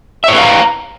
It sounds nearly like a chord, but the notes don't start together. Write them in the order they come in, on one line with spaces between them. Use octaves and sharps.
E5 C#5 B4 F5 A#5